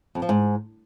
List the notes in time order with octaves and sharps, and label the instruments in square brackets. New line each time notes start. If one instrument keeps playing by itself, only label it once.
[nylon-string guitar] F2
F3
G#2